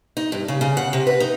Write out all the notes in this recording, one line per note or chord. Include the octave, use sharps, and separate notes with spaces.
D#4
G2
C#3
C#3
F#5
C3
B4
D#4